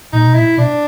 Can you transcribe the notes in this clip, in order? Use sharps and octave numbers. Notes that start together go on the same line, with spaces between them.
A#2 D#4
B2
A#2 E4
B2 D4